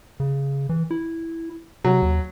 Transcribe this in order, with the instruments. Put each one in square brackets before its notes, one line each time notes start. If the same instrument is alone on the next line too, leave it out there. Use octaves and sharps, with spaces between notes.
[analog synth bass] C#3
E3
E4
[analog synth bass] C3 [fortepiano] F#3
[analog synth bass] D#2